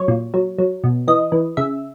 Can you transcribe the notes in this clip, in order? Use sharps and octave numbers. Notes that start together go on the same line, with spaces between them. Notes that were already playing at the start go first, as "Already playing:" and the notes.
Already playing: F#3 C#5
A#2
F#3
F#3
B2
E3 D#5
E3
C#3 E5